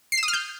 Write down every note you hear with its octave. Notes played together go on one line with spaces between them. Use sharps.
C7
E7
D#6
F6
G6